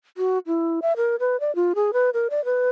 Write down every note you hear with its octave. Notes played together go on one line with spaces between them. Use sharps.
F#4
E4
E5
A#4
B4
D5
F4
G#4
B4
A#4
D5
B4